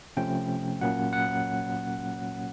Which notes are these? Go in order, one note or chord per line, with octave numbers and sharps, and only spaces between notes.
C3 F3 A3 C#4 G5
A#2 F#3 A#3 C#4 F#5
F#5